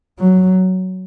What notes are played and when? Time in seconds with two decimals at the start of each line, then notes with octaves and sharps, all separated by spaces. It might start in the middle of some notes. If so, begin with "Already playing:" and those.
0.19 F#3